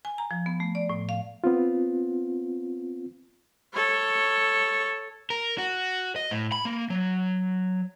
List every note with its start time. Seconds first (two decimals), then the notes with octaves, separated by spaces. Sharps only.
0.05 G#5
0.18 A#5
0.31 F3
0.46 B3
0.60 A3
0.75 D5
0.90 A2
1.09 F5
1.44 B3 C4 F4
3.74 A4 C#5
5.30 A#4
5.58 F#4
6.16 D#5
6.31 A2
6.52 B5
6.65 A#3
6.90 F#3